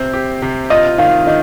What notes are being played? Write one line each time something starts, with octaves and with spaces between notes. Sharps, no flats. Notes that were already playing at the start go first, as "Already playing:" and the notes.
Already playing: C3 C4
G4
C3
F4 D#5
D#3 F5
D#3 D#5